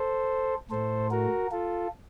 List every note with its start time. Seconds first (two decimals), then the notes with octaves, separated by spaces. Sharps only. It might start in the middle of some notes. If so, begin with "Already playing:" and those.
Already playing: A4 C5
0.71 A2 A3 A4 C5
1.11 F#4 A#4
1.51 F4 A4